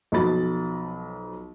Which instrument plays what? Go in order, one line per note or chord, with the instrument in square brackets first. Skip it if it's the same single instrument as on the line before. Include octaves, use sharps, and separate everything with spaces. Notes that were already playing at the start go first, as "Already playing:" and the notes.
[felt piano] B1 F3 F#3 D#5 B5 A6